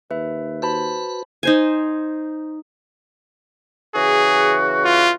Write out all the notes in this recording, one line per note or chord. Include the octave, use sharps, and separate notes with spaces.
D#2 B4 E5
F#4 B4 C5 A5 B5
D#4 C5 G#5
C#3 E3 F#4 G#4
F4